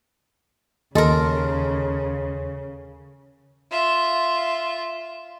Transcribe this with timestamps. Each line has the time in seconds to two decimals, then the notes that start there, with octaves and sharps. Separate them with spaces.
0.95 D#2 C#3 A4 A#4 D#5 C6
3.71 F4 E5